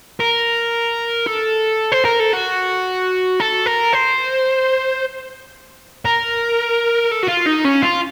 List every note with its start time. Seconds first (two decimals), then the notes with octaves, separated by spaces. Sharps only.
0.20 A#4
1.27 A4
1.92 C5
2.05 A#4
2.20 A4
2.33 F#4
3.40 A4
3.66 A#4
3.93 C5
6.05 A#4
7.12 A4
7.23 F#4
7.28 F4
7.47 D#4
7.65 C#4
7.82 F4